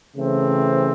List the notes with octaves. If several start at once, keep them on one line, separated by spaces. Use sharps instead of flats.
C#3 E3 A3 C4